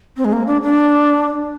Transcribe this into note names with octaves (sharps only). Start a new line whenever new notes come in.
C4
G#3
A#3
D4
D4